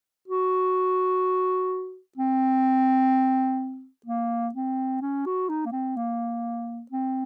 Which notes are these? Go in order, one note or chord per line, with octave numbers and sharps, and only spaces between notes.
F#4
C4
A#3
C4
C#4
F#4
D#4
A#3
C4
A#3
C4